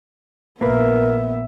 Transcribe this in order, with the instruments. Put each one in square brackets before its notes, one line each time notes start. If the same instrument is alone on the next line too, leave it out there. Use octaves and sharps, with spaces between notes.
[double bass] A#1 [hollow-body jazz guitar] A#3 B4 [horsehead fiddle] B3 E5 [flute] A#4